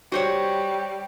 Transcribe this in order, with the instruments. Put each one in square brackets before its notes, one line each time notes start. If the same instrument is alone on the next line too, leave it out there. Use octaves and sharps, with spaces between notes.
[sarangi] G3 [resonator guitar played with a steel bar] F#4 C5 C#5